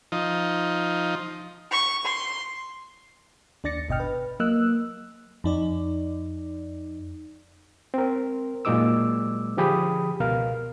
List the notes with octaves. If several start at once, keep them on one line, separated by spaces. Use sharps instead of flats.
F3 D#4
C#6
C6
D#2 D4 D5 A6 A#6 C#7
G1 B2 D#5 G5 F6
B4
F#3 A#3 D#5 E6 F#6
F2 D#4 D5
C4 A#4
A#2 F#3 G#3 D#4 D6 E6
D3 F3 G4 G#4 B5 D#6
C#2 B2 A#4 F5 F6